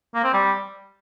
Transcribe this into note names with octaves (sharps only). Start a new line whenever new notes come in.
A#3
C4
G3